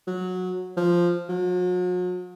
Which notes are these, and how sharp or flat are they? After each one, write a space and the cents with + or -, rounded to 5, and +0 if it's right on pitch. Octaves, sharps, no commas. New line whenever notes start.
F#3 -15
F3 -5
F#3 -40